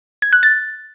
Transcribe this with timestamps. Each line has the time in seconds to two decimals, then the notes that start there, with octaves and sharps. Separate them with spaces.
0.22 G#6
0.33 F#6
0.43 A6